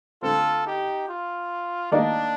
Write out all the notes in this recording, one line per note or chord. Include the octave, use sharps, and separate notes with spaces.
D3 A3 C4 F4 A4
D#4 G4
F4
D#3 A#3 D4 D#4 A#4 D5